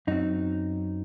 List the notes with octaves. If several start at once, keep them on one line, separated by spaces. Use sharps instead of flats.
F#2 F#3 C4 D#4